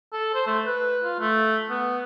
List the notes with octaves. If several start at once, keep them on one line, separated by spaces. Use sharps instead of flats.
A4
C5
A3
B4
F4
A3
B3